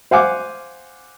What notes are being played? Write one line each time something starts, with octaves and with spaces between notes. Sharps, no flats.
C5 F5 F#5 G#5 D6